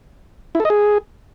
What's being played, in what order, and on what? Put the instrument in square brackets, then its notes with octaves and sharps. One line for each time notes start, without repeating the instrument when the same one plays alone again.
[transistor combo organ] E4
A4
D#5
G#4